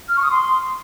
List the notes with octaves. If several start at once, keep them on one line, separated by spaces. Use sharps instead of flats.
F6
C#6
D#6
C6